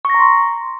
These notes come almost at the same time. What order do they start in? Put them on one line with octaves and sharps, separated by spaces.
C#6 A#6 A#5 C6